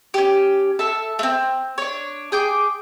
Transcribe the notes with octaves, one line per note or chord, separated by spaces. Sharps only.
C#4 G4
A4 E5 A5
A3 C4
D4 C#5
G#4 G5 D6